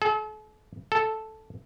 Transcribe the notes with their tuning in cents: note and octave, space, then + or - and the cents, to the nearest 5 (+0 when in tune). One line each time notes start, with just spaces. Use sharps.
A4 -45
A4 -5